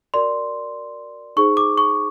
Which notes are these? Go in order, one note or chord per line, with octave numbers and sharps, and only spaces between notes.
F#4 A#4 D5 C6
D#4 G#4 C5 C#6
D6
C#6